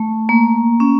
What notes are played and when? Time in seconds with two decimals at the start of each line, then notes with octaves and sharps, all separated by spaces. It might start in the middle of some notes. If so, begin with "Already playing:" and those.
Already playing: A3
0.29 A#3
0.80 C#4